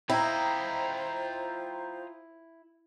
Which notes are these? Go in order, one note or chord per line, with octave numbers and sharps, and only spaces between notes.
E4 F4 C5 D#5 G5 A#5